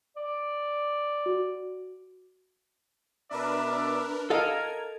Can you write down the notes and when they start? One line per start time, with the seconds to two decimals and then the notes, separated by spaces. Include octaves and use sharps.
0.17 D5
1.26 F#4
3.31 B2 D4 A#4 B4 D5 E5
4.30 A4 A#4 D#5 F5 G#6